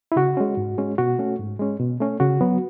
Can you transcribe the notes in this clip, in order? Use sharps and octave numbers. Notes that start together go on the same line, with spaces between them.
E4
C#3 F#4
G#3 C#4
G#2
G#3 C#4
B2 F#4
A3 C#4
G#2
G#3 C#4
B2
A3 C#4
C#3 F#4
F#3 B3